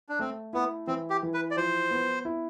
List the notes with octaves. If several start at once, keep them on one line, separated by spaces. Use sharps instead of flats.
D4
A3 C4
B3 E4
E3 C4
G4
E3
B4
D5
F3 C5
B3
E4